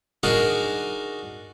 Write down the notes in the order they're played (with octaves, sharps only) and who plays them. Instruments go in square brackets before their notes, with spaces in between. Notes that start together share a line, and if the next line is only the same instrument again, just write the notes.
[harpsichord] D4 D#4 F#4 G#4 A#4